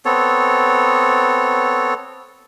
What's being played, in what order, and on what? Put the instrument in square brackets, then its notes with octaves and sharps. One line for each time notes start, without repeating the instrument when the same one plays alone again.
[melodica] B3 C4 A4 C#5